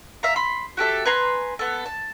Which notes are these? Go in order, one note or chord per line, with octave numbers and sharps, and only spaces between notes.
E5 F5 A#5
B5 C6
F#4 G4 A4 E5
B4 G#5 A#5 C6
B3 A4
A5